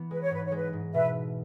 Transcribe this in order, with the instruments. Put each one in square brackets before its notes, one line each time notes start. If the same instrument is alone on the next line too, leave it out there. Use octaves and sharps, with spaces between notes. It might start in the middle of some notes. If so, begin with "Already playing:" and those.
Already playing: [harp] E3 B3
[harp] G#3 [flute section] B4
[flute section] C#5
[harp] G#2 [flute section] B4
[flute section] C#5
[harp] G#3 [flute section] B4
[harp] G#2
[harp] B2 [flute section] B4 E5